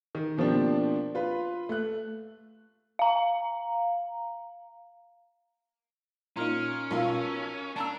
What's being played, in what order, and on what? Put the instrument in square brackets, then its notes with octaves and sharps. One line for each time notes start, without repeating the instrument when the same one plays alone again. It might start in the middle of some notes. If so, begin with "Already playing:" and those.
[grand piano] D#3
B2 F3 A#3 C4 D4 G4
F4 B4
A3 F#6
[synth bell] F5 A#5
[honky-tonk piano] A#2 D#4 [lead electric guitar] C#4 [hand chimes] A#5 F6 D7
[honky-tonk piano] B1 F4 [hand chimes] A#4 A#5 E6
[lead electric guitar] D4 [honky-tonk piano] A5 A#5 E6